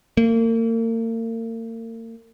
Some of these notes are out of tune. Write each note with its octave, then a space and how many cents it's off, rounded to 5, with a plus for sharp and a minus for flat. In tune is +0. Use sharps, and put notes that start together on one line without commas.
A#3 -40